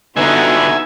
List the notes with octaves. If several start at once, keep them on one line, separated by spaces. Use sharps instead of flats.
D3 B3 D#4 F#4 B4 E5 G#5